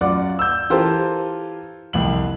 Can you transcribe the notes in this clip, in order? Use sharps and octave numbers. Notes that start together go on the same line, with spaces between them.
F#2 F4 D5 F#5 D6
E6 G6
E3 F4 G4 A4 A#4 C5
C2 F2 F#7